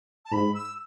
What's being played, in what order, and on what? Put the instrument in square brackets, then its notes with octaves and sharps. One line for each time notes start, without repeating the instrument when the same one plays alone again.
[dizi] A5
[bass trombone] G#2 [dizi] B5
[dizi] E6